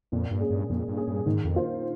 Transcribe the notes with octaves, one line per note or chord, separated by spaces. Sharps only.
F2 A#2
G2
G#3 C#4 G#4
G2
F2 A#2
G2
G#3 C#4 G#4
G2
G#2 D#3
F2
A#3 F4 C5